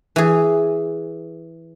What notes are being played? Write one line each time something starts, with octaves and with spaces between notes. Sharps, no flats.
E3 G#4